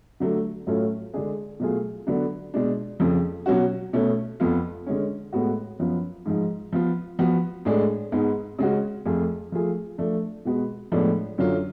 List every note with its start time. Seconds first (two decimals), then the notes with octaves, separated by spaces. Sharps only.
0.20 D3 F#3 A3
0.67 A2 F#3 A3 C#4 F4
1.14 D3 G#3 D4 G#4
1.60 B2 F#3 A3 F4 G#4
2.07 D3 F#3 B3 D4
2.54 B2 G#3 D4
3.00 F2 C#3 F3
3.46 B2 F#3 C#4 F#4
3.93 B2 A3 C#4
4.40 F2 F3 B3 F4
4.87 D3 G#3 C#4
5.33 A2 G#3 B3 F#4
5.79 F#2 F3 B3 F4
6.26 G#2 F3 G#3
6.73 F3 B3 F4
7.19 F3 B3 F#4
7.65 A2 G#3 D4 G#4
8.12 G#2 G#3 B3
8.59 C#3 G#3 C#4 F#4
9.06 F2 F3 A3 F4 G#4
9.52 F3 A3 F4 G#4
9.98 F3 A3 D4
10.45 B2 G#3 B3 F#4
10.92 A2 F3 G#3 B3 D4
11.38 F#2 D3 F#3 C#4 F4